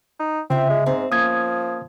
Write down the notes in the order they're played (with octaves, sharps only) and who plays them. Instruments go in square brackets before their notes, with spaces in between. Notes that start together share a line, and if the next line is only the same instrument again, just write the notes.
[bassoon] D#4
[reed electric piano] C#3 [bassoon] C4 [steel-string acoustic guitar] F4 E5
[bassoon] G#3
[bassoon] G#2 [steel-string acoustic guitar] C4
[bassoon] F3 [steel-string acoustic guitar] A#3 C#4 [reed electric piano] D#6 G#6